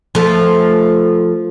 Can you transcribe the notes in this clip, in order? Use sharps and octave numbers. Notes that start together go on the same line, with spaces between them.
F3 A3